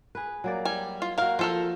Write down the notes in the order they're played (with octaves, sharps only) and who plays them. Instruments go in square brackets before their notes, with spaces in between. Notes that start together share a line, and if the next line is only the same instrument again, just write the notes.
[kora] G#4 B4
F#3 A#3 D5
[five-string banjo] G3 G#5
F4
[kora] A#3 F#4 [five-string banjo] A#4 F5
[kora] F3 [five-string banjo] F4 A4 A#4